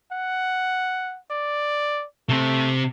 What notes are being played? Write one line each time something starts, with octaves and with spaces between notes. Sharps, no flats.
F#5
D5
C3 A3 C4